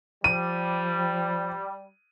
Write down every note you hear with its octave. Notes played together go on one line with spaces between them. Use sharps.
F3 G3 D#7